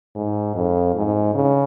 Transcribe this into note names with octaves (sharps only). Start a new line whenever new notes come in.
G#2
F2
G#2
C#3